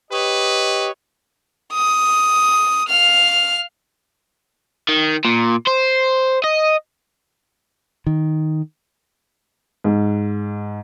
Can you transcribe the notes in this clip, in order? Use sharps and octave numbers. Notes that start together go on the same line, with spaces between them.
G4 B4 C#5 D#5
D#6
F5 F6
D#3
A#2
C5
D#5
D#3
G#2